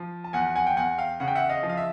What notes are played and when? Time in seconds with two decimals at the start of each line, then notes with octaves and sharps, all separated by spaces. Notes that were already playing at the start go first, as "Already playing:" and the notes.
Already playing: F3
0.24 A5
0.33 E2 F#5 G#5
0.56 F#5 G#5
0.67 G5
0.77 E2 F#5 G#5
0.98 F5 G5
1.20 C#3 F#5
1.28 G5
1.35 E5 F#5
1.49 D#5 F5
1.63 F3
1.69 F5
1.77 E5